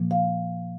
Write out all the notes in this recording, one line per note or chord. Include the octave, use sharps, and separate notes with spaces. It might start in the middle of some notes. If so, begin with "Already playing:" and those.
Already playing: A#2 F3 A#3
F5